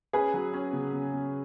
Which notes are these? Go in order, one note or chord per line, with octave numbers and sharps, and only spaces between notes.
C#4 G#4 B4
F#3
C#4
C#3
C#3
C#3